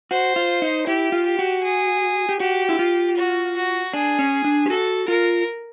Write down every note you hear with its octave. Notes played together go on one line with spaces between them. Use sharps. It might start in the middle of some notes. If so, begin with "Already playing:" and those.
F#4 C5
F4
D#4
E4 G4
F4
G4
F#4
G#4
G4
F#4 G4
E4
F4
F#4
F#4
D4 G#4
C#4
D4
G4
F#4 A4
F4 A#4